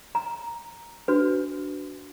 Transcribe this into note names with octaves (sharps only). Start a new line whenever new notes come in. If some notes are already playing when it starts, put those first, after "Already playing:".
A#5
D4 F#4 B4